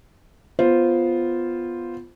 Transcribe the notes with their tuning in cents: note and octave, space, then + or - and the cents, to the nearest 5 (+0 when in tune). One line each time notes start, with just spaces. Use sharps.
B3 +0 F4 -5 C5 +0